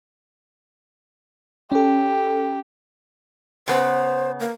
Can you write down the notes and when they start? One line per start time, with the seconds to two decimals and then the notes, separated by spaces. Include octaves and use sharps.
1.72 C#4 G4 A4
3.68 C#3 B3 C5
4.40 A#3